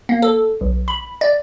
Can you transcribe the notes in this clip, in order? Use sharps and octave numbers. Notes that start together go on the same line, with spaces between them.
A#3
A4
B1
B5
D5